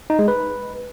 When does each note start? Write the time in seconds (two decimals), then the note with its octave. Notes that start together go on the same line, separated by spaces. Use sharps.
0.10 D#4
0.19 G#3
0.28 B4